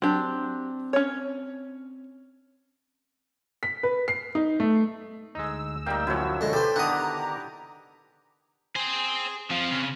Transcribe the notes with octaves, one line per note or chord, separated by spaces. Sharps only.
F#3 C4 D4 G4
C#4 C#5
B6
B4
C7
D#4
A3
D2 G#3 D#4 E6
G3 A#3 D#4 G5
F#2 F3 E4 F#4 C#5
D3 G#3 F#4 C#5
G4 A4 B4 C5
D3 D#3 B3 D4 F#5 A#5 D6 D#6
G#4 C5 G5
F3 C4 F5
C#3